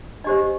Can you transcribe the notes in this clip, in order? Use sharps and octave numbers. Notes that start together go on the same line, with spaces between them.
D4 G4 C5 D#5